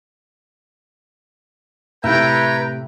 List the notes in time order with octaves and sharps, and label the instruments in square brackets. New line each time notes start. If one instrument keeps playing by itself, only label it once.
[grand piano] A2 C3 [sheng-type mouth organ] B4 A#5 [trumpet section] C#5 G5 [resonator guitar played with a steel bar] E5